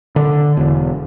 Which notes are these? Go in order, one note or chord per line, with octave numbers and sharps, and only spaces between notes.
D3
E1